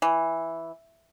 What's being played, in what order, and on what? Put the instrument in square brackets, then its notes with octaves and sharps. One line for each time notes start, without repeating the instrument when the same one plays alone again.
[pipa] E3